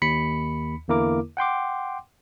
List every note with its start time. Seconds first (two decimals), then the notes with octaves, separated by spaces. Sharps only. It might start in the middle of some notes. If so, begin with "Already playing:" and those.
0.02 D#2 B5 B6 C#7
0.88 E2 D3 A#3 E4 A#4 D6
1.37 F#5 G5 C6 D6